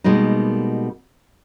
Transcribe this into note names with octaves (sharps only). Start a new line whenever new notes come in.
B2 G3 G#3 A#3 D#4